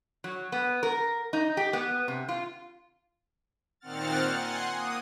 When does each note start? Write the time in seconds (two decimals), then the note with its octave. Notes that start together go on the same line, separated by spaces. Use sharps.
0.24 F#3
0.52 B3
0.83 A#4
1.33 D#4
1.57 G4
1.73 B3
2.08 C3
2.29 F4
3.80 A#2 D#3 C4 F#5 F6 A6
4.33 F#5 G#5 C6
4.68 A#3 D#6